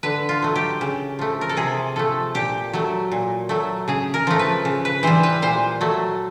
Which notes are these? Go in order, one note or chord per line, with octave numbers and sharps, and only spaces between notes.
D3 B4
F4
F#3 A3
G4
C#3
F3 A3
A#4
A4
C3 G#4
F3 A3 A4
A#2 G4
F#3 A3
A#2
F#3 A3
C#3 G#4
A#4
F3 A3
B4
C#3
B4
E3 G3 C5
B4
A#2 C5
F#3 A3